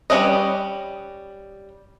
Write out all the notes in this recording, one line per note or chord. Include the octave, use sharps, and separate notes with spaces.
G3 C#4 F4 B4 D#5